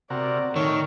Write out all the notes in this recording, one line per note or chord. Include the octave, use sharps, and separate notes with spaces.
C3 F#4 A#4 D5
A2 D#3 A#4 C#5